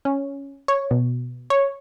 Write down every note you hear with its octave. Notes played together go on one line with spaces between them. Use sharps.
C#4
C#5
B2
C#5